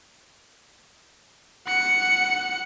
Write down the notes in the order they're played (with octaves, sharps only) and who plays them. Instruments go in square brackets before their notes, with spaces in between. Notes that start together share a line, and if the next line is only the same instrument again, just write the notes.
[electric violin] F#5 C#7